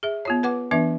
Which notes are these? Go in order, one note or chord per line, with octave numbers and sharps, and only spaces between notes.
G#4 E5
B3 F4 C#5
B4 F#5 D6
E3 B3 D4 B4 E5